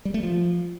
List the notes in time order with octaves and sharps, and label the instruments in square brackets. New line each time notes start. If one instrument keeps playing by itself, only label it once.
[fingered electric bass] G3
A3
F3